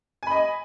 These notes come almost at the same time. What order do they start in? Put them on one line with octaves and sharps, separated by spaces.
G#5 B5 D#5